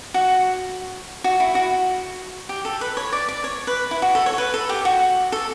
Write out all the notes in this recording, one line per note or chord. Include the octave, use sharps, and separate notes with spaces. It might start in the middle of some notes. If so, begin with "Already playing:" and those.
F#4
F#4
E4
F#4
G4
A4
B4
C#5
D5
D5
C#5
B4
E4
F#4
A4
C#5
B4
A4
G4
F#4
A4